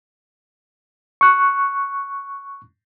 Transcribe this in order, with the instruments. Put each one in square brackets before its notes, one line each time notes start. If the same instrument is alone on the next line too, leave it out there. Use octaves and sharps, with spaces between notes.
[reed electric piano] C#6 F#6